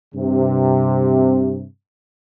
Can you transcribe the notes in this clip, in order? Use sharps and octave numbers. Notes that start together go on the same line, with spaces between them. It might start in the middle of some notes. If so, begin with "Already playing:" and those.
G2 C3